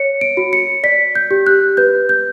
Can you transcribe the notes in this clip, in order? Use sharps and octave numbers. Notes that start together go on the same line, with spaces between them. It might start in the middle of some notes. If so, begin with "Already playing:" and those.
Already playing: C#5 C#7
D7
F#4
C#7
D5 B6
G6
G4
F#6
B4 G6
G6